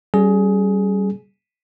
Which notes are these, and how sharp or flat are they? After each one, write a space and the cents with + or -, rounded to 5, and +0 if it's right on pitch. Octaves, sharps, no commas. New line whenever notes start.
G3 -20 C#4 +0 G#4 +20